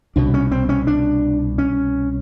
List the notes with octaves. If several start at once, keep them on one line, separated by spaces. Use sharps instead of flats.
C2 B2 D4
C#4
C4
C#4
D4
C#4